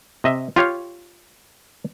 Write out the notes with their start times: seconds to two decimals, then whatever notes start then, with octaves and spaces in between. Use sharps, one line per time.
0.24 C3 D#5 E5
0.56 F4 G4 C#5 F5